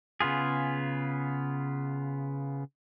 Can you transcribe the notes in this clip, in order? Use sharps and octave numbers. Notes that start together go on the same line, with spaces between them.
C#3 B3 F4 G#4